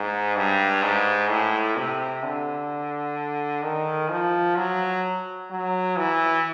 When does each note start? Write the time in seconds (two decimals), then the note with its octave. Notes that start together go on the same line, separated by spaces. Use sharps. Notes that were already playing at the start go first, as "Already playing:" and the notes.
Already playing: G#2
0.36 G2
0.83 G#2
1.30 A2
1.77 C3
2.23 D3
3.64 D#3
4.10 F3
4.57 F#3
5.51 F#3
5.97 E3